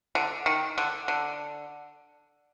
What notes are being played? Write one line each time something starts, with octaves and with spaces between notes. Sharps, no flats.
D3
D#3
D3
D3